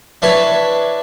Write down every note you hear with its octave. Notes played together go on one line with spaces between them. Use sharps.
D4 E4 B4 C#5